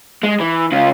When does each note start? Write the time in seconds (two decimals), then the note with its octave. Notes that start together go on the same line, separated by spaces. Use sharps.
0.23 G#3
0.40 E3
0.72 C#3 F4